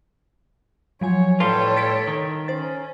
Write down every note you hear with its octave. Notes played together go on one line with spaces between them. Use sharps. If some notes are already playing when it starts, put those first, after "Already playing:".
F3 F#3 C#5 G#5
A2 G3 F4 A4 B4 C#5 A5
A6 B6 D7
D#3
C#4 C5 A6